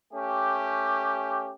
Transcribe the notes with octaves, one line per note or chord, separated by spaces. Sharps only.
A3 C#4 G4